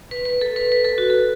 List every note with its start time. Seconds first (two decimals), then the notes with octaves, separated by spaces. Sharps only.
0.11 B4
0.25 B4
0.41 A4
0.56 B4
0.72 B4
0.85 A4
0.98 F#4
1.10 A4